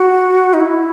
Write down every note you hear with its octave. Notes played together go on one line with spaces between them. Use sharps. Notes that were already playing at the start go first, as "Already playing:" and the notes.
Already playing: F#4
D#4
E4